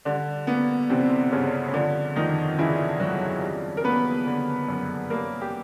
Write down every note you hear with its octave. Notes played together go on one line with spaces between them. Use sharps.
D3 G3 D4
A#3 B3
C3 E3 C4
G2 C#3 C#4
C#4
D3 F3 D4
F2 D#3 D#4
C#3 E3 E4
F2 F#3 F#4
G3
A#4
A#3 B3 B4
D3
F#2
G3 A#3 A#4
G4